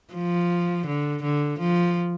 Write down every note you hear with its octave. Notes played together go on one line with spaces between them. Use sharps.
F3
D3
D3
F3